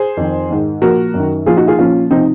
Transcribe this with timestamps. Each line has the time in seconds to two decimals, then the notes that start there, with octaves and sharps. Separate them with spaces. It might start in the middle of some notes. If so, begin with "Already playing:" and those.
Already playing: G#4 C5
0.17 F2 D#3
0.49 G#2 D#3
0.82 A#2 F3 F#4 A#4
1.14 F#2 D#3
1.46 A#2 F3 F4 G#4
1.57 D#4 F#4
1.67 F4 G#4
1.78 A#2 F3 C#4 F4
2.11 C3 F3 C4 D#4